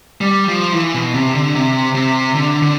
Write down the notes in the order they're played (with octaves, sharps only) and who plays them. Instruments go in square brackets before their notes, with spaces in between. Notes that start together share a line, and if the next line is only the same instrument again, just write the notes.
[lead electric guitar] G3
F3
E3
B2
C3
D3
C3
C3
D3
D3